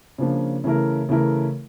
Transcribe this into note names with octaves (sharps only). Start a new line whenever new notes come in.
C#3 F3 A#3 D4 F4
C#3 E3 A3 E4 A#4
C#3 E3 A3 E4 A#4